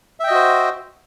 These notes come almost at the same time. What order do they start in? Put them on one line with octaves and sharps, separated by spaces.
E5 G5 D#5 F#4 C5